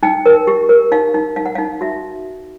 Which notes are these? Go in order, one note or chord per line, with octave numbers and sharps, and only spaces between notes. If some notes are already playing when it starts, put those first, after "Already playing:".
D#4 G5
A#4
G4
A#4
D#4 F5
D#4
D#4 F5
F#5
F5
D#4
F#4 E5